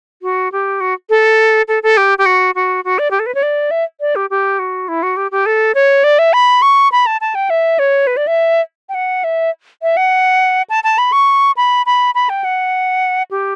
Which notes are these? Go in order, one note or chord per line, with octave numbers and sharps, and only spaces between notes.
F#4
G4
F#4
A4
A4
A4
G4
G4
F#4
F#4
F#4
D5
G4
A4
B4
C#5
D5
E5
D5
G4
G4
F#4
E4
F#4
G4
G4
A4
C#5
D5
E5
B5
C#6
B5
A5
A5
G5
E5
C#5
B4
D5
E5
G5
F#5
E5
E5
F#5
A5
A5
B5
C#6
B5
B5
B5
G5
F#5
G4